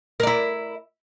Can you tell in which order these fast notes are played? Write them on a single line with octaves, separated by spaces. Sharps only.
A#4 D5 E4